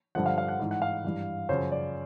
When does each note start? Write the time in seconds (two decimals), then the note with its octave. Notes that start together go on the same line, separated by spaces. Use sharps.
0.15 G2 D3 F3 F#5
0.26 F5
0.38 F5
0.48 F#5
0.60 G#2 E3
0.71 F#5
0.82 F5
1.04 G2 E3
1.49 F#2 C#3 F3 C5
1.72 D5